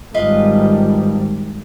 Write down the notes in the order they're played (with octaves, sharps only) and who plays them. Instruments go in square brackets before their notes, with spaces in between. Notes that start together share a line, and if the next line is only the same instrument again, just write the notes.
[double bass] G#1 G3 [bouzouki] F4 B4 D#5